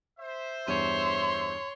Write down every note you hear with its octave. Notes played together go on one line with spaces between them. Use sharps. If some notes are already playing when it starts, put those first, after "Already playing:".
C5 E5
E2 G2 C#5 C6 D#7